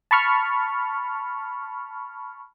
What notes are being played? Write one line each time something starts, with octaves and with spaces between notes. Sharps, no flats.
A5 B5 C#6 F6